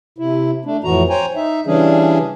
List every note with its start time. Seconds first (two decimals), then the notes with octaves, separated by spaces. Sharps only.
0.18 C3 E4
0.65 A3 D4
0.84 F2 A2 E3 F#4 A#5
1.09 C5 C#5 G5 G#5 A#5
1.36 D#4 E5
1.67 C#3 E3 G3 C#4 D4 G#4